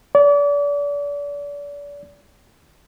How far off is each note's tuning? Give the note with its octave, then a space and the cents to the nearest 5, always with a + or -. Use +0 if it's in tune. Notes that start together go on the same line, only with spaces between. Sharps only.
D5 -35